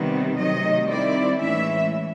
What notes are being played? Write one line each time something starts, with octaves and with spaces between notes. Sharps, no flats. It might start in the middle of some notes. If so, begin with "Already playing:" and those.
Already playing: C3 D#3 G3 B3
C3 D#3 F#3 A3 D#5
D#3 G3 C4 E4 D5
A2 E3 G#3 C#4 E4 E5